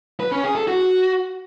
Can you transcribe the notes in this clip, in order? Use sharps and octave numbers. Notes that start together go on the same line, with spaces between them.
B4
C#4
G#4
A4
F#4